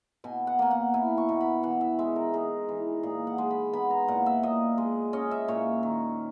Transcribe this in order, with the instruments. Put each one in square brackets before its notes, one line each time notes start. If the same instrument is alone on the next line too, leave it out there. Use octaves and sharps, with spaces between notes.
[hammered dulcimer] B2 G#5
F#5
A#3 G#5
F#5
E4 G#5
C#6
B2
B5
E3 F#5
E5
G#3 E5
A#4
D#4 G#4
E3
A#2 G#4
F#5
G#3
B5
B3 B5
A#5
A#2 F#5
E5
A#2 D#5
G#3
C#4 D#5
E5
A#2 C#5
D#3